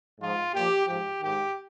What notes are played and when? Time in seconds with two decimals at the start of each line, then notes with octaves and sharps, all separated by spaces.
0.21 G#2 F3 F4
0.54 A#2 F3 G4
0.88 G#2 F3 G4
1.21 G#2 D#3 G4